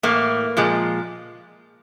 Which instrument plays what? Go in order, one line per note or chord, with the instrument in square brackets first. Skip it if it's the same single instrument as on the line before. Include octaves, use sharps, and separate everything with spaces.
[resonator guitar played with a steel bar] A2 E3 A3 A#3
A#2 F3 G#3